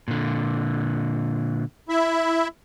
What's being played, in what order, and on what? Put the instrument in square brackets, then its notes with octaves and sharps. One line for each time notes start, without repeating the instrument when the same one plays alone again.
[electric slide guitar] A#2 D3
[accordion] E4 E5